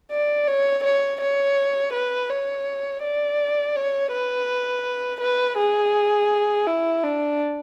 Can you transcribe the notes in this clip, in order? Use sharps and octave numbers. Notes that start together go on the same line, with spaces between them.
D5
C#5
C#5
C#5
B4
C#5
D5
C#5
B4
B4
G#4
E4
D4